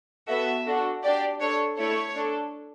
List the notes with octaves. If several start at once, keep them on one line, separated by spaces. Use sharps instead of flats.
B3 F#4 A4 E5
D4 F#4 A4
D4 G4 D5
D4 A4 C#5
A3 E4 A4 C#5
D4 A4